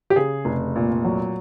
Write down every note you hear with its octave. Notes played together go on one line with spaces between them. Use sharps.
G4
C#3 G#4
F1
A#2
F#3